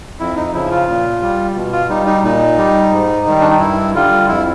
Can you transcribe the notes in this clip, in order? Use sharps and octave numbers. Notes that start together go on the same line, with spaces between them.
F2 E4
D#4
C#3 F3 E4
F4
A#2
G3
B2
F4
G3 D#4
D#4
A#2 D#4
G3
G#2
D#3 G3
D4
D#4
G2 E4
D3 G3 F4
F2 E4